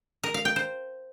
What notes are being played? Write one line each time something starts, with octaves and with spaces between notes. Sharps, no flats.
A#4
F5
G5
C5